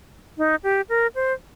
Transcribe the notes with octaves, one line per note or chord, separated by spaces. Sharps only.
D#4
G4
A#4
C5